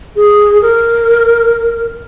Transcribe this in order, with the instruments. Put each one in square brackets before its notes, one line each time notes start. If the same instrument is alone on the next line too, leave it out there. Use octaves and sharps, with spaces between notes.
[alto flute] G#4
A#4